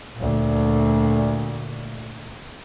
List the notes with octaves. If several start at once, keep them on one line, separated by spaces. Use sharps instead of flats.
D2 A#2